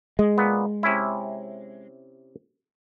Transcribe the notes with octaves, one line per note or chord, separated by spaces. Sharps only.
G#3 D#5
A#2 B3
C3 C#4 E4